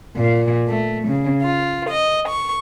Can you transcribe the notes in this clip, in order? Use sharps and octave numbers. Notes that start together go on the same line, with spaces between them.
A#2
A3
C#3
F4
D#5
C#6